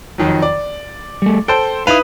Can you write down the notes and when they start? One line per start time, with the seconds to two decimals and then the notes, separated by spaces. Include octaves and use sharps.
0.18 F2 D#3 F#3
0.42 D5
1.22 G3 A3
1.48 A4 C5 G5
1.87 D#4 E4 B4 F5 D#6